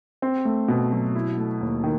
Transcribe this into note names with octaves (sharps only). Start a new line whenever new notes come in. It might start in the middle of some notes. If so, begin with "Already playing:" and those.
C4
A3
B2
F#3
E4
A3
D#2
D#3